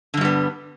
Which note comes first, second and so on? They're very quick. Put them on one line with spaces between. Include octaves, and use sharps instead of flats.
D3 G2 G3 B3